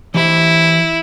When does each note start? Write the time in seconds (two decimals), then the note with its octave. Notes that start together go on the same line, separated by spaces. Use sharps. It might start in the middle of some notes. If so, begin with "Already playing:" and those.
0.14 E3 E4 G4 C5